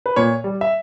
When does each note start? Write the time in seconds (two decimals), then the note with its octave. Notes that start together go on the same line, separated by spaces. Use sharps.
0.06 B4
0.16 A#2 C#5
0.44 G3
0.61 E5